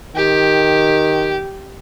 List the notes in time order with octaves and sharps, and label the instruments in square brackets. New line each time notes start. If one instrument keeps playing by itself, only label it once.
[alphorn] D#3 [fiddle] G4